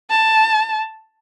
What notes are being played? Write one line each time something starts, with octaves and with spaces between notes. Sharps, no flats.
A5